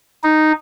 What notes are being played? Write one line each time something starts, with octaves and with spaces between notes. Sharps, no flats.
D#4